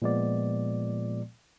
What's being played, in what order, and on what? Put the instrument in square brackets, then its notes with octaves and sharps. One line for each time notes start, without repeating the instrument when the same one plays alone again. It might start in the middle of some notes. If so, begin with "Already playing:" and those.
[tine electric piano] A#2 F3 G#3 B3 D5